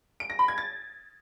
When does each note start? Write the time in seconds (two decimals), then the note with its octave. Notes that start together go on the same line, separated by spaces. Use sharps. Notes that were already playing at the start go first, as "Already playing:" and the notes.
0.20 D7
0.30 A#6
0.39 B5
0.48 G#6
0.58 A6